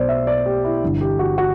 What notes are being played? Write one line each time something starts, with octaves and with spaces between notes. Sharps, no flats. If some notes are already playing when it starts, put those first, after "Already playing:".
Already playing: B1 B2 C5 D5
E5
D5
G4
E4
G1 G2 E3
G4
F#4
F#4